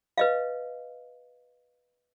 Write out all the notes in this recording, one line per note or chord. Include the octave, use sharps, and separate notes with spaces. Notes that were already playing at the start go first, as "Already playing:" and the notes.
B4 D#5 F5